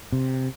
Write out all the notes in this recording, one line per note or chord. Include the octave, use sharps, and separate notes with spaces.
C3